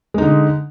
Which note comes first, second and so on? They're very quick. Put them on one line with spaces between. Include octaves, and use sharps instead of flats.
G#3 D#4 D3